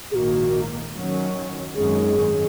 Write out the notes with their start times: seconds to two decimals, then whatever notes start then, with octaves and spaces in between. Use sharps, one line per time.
0.11 A#1 G#2 D#3 A#3 F#4 G#4
0.94 F#2 D#3 F#3 C#4
1.75 G#1 F#2 D#3 G#3 C#4 G#4